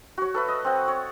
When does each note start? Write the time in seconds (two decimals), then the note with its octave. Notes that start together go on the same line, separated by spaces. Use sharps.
0.18 F#4 C#5
0.34 A4 B4 E5
0.48 D#5
0.64 C4 F#5
0.88 C#5